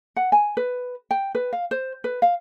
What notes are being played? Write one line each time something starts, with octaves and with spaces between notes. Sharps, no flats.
F#5
G#5
B4
G5
B4
F5
C5
B4
F5